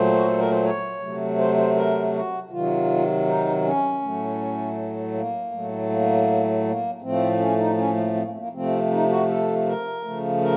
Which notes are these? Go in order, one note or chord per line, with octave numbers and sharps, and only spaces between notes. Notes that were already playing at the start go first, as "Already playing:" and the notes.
Already playing: A#2 F#3 A3 C5
F#4
A4
A#4
C5
C#5
C3 F#3 A3
C5
C5
A#4
F#4
C3 D#3 F#3 F4
D#4
C#4
A2 F#3 A3
A#3
A2 F#3 A3
A#3
A#3
A2 F3 A3 C4
C#4
D#4
C#4
A#3
C4
A#3
A3
A#3
C3 F3 A3 C4
D#4
F#4
A4
A#4
C#3 F3 A3
A#4